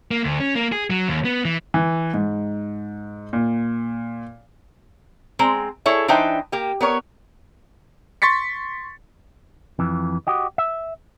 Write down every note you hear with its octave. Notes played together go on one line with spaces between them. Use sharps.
A#3
D2
C#4
A#3
G#4
F#3
D#2
B3
E3
E3
G#2
A#2
G#3 C4 A#5
E4 G#4 A4 C#5 E5
E3 D4 D#4 C5 E5 G5
A#3 G4
B3 A#4 C#5
C6 C#6 A6 B6 C#7
F2 E3
F#4 G4 D#5
E5